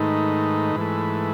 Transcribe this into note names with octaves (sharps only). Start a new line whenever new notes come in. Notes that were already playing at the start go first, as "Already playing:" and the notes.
Already playing: G#2 D#3 A3 D#4 B4
G#2 E3 A3